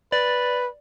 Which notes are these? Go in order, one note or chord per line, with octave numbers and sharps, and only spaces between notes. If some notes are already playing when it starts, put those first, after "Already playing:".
B4 D5